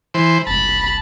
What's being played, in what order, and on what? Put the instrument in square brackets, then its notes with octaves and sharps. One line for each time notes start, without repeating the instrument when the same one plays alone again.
[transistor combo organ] E3 C5
[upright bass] F#1 C2 [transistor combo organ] A5 [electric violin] B5